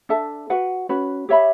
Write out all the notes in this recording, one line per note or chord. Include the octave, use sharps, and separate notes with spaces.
D4 A4 E5 A5
F#4 B4 F#5
C#4 F#4 B4
G4 C#5 E5 B5